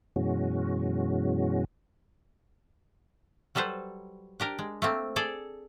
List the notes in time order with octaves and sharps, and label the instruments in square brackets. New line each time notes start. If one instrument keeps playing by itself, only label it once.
[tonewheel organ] F#2 B2 E3 G#3 C#4 F#4
[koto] F#3 G3 A4 B4 C5
D4 G4 A#4
G#3
A3 A#3 C4
G#4 A4 D5